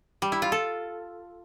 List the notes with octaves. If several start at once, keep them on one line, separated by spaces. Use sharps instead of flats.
G3
E4
F4
A4